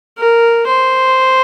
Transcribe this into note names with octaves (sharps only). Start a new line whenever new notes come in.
A#4
C5